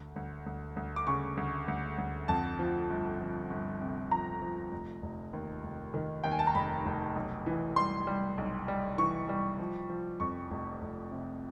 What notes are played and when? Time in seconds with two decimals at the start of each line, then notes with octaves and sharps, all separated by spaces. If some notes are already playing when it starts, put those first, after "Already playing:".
Already playing: D2
0.16 D2
0.46 D2
0.76 D2
0.96 D6
1.07 C#3 C#6
1.37 D2
1.68 D2
1.98 D2
2.28 F2 A5
2.59 F3
2.90 G1
3.20 F3
3.50 G1
3.81 C3
4.11 F3 A#5
4.42 F3
4.72 F1
5.02 F1
5.33 D#2
5.64 F1
5.94 D#3
6.24 D#2 G5
6.31 G#5
6.39 A5
6.47 A#5
6.55 F1 B5
6.85 F1
7.16 B1
7.46 E3
7.76 G3 C6
8.07 G3
8.38 B1
8.68 G3
8.98 E3 C#6
9.29 G3
9.59 F3
9.89 F3
10.20 F2 C#6
10.51 F1
10.81 F1
11.11 C3